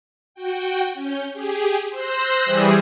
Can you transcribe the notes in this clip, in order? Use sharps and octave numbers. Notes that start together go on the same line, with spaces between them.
F#4 G5
C#4 G6
G4 G#4
C5 E6 F#6 A#6
E3 G3 G#4